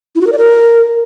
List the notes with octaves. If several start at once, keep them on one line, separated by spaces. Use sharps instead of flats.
E4
F#4
A#4
D5
A#4